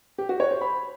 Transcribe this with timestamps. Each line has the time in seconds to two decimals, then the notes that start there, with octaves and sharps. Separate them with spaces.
0.18 G4
0.29 F#4
0.40 C#5
0.51 C5
0.61 B5